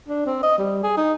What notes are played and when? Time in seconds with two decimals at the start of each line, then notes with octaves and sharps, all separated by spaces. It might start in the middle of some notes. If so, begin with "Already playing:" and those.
0.09 D4
0.26 C4
0.43 D#5
0.58 G3
0.84 G#4
0.97 D#4